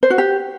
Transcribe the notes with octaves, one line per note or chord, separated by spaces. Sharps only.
C5
F#4
G4